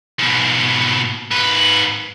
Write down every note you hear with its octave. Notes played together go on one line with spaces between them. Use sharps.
G#2 B2
G#2 B4